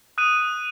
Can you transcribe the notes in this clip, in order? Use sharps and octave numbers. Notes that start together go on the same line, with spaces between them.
D#6 F#6 D#7